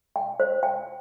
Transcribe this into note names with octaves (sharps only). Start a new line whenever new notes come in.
G5
C5
G5